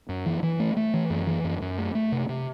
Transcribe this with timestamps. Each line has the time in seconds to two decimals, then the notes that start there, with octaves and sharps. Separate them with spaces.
0.09 F#2
0.26 E3
0.43 E3
0.60 A3
0.77 A3
0.94 E3
1.10 F#2
1.27 E3
1.44 F#2
1.62 F#2
1.78 A3
1.95 A3
2.12 C3
2.29 C3